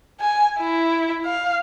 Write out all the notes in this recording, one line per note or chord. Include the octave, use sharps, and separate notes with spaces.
G#5
E4
F5